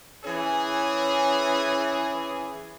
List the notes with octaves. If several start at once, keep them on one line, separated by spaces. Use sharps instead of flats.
E3 C#4 G#4